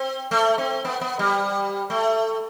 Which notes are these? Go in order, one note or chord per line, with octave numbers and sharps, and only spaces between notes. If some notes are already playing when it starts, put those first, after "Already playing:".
Already playing: C4
A3
C4
B3
B3
G3
A3